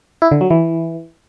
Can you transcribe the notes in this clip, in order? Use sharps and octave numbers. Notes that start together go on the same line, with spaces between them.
E4
D3
F#3
E3